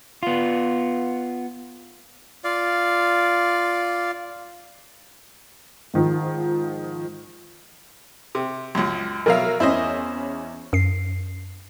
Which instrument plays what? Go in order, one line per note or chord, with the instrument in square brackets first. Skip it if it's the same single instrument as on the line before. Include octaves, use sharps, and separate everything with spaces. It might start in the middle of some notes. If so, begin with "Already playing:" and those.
[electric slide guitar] B3 F4
[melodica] F4 D5 F5
[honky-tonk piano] G#2 D#3 F3
[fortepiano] C3
C#2 F#2
[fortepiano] B2 F#3 F5 [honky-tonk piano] A#4 E5
[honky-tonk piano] E2 C#4 [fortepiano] E4 C5 D#5
[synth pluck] F#2 C7